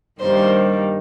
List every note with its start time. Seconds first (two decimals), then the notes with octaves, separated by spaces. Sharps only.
0.20 G2 D#3 G3 A#3 C5